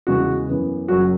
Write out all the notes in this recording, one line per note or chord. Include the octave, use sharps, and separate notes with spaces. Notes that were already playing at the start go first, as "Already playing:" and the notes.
E2 C#3 E3 G#3 F#4
F#2 E3 B3
F#1 F#2 F#3 C#4 F#4